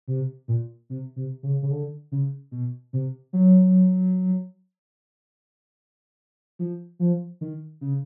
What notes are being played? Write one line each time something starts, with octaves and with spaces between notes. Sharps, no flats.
C3
A#2
C3
C3
C#3
C#3
D3
C#3
B2
C3
F#3
F3
F3
D#3
C#3